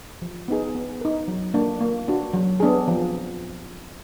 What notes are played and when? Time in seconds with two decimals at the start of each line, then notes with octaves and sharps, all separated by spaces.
0.22 F3
0.48 B3 D#4 G#4
0.75 B3
1.01 D#4 A#4
1.28 F#3
1.54 A#3 D4
1.80 A#3
2.08 D4 F#4
2.33 F#3
2.60 B3 D4 G#4
2.88 F3